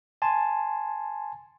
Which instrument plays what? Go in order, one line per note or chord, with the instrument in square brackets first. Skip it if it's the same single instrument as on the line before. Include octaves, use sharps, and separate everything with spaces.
[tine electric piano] G#5 A5 C6